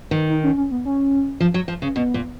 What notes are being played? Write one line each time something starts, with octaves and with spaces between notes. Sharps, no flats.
D#3
D#4
C#4
C#4
B3
C#4
F3
F#3
F3
C#3
B2 B3
A#2